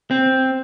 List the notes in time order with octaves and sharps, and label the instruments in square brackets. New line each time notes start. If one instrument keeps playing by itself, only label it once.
[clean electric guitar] C4